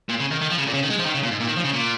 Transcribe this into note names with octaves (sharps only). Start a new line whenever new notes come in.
A#2
C#3
D#3
D#3
F3
C#3
A#2
C#3
D#3
G#3
F3
D#3
C#3
A#2
G#2
A#2
D#3
F3
C#3
A#2